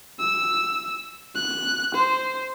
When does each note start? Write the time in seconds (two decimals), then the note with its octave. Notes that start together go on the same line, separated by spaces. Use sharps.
0.20 E6
1.36 F#6
1.94 C5